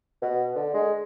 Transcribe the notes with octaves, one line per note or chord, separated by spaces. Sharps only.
B2
D3
G#3